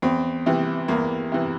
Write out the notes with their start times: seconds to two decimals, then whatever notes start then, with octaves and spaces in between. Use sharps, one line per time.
0.02 E2 C4
0.46 C3 E3
0.88 E2 A#3
1.32 C3 E3